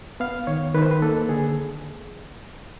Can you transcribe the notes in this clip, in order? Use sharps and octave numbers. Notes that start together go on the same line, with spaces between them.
B3 F5
D#3 C#5
D#3 B4
C5
B4
A#3 A4
D3 G#4